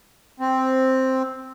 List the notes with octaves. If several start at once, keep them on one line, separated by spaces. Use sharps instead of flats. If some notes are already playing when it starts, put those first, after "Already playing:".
C4